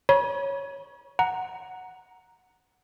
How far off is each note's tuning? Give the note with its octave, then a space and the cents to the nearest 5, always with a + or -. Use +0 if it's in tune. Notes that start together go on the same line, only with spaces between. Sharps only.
C#5 +0 B5 -40
F#5 +0 A#5 +0